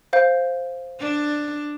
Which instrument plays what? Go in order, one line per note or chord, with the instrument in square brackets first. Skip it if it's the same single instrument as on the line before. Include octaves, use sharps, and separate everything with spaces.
[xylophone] C5 F5 G6
[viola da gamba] D4